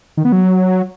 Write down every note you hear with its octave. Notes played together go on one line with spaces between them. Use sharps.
D#3
B3
F#3